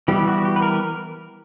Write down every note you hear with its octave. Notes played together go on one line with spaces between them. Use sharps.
E3 G3 B3 G4
F#4
G4
B4
A#4